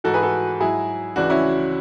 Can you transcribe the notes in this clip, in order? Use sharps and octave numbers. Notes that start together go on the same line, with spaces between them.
G#2 E3 F#4 A4
G#4 B4
F#4 A4
G#2 F#3 E4 G#4
C#2 C#3 E3 D4 F#4
C#4 E4